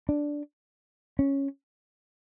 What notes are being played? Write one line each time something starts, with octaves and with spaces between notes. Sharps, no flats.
D4
C#4